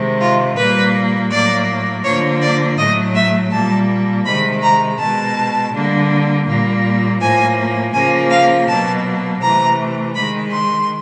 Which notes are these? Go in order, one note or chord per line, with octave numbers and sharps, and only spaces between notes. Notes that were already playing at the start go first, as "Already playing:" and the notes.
Already playing: C3 D#3 G#3
F4
A#2 G3 A#3 B4
A2 F#3 A#3 D5
D3 F3 A#3 C#5
D5
A2 F#3 A3 D#5
E5
A#2 G3 A#3 A5
C3 D#3 G#3 B5
A#5
B2 G#3 A5
D3 G3 A#3
A#2 G3 A#3
A2 F3 A#3 G#5
C#3 F3 A#3 G#5
F5
B2 F#3 A#3 A5
C3 E3 A3 A#5
D#3 G#3 B5
C6